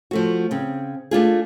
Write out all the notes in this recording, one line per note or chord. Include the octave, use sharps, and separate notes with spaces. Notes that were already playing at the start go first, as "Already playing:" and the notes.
F3 A3 F#4
C#3 C4
A3 D4 F4 G#4